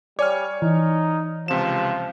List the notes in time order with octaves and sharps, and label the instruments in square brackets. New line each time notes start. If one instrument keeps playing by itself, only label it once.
[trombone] G3 [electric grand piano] C#5 G#5 F6 [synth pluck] D5
[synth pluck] E3 [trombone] D#4
[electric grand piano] C#2 C3 E7 [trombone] F3